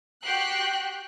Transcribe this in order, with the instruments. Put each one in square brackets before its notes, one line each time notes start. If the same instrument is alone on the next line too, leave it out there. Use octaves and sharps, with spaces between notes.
[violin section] F#4 G4 G5 F#6 C7